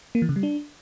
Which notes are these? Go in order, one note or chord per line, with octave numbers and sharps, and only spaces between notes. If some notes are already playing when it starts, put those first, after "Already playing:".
A#3
E3
C#3
G3
D4